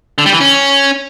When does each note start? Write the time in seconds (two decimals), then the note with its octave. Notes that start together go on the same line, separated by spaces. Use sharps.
0.18 D3
0.26 G3
0.33 E3
0.40 C#4